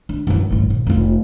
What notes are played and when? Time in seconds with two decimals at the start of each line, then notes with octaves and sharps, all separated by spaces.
0.09 D4
0.27 F#2 E3
0.50 A1 G2
0.70 A#1
0.87 F1 F4